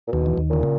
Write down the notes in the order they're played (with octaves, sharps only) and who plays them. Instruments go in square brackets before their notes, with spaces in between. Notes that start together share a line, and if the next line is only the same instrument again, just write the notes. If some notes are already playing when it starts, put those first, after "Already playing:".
[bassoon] A#2
[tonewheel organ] D#2 D#3 [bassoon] B2
[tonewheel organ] E3
D#2 D#3
[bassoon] A#2 [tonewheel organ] D3
[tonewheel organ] C#3